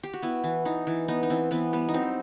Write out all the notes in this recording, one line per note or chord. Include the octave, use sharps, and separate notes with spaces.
G4
F#4
B3 E4
E3
E3 D#4
E3
B3 D#4
D#4
E3 C4
E3 B3
G3 B3
D#4
F#3 C4